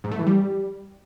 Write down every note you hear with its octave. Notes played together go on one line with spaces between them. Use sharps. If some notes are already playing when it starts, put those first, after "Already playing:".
G#2
A3
E3
G3